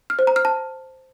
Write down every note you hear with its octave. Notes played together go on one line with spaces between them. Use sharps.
F6
C5
A#5
F6
A5